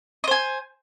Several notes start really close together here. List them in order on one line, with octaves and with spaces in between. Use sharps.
D#5 C5 G#5